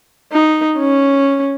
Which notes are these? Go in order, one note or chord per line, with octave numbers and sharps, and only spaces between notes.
D#4
C#4